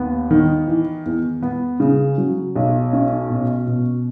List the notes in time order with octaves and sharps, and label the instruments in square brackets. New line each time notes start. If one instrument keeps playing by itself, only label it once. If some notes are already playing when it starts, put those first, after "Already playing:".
Already playing: [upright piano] D#2 B3
D#3
E3
E2
B3
C#3
F#3
B1
C#4
B2
B2